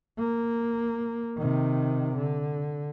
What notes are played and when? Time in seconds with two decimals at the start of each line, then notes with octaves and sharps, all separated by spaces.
0.18 A#3
1.38 C3 D#3
2.16 D3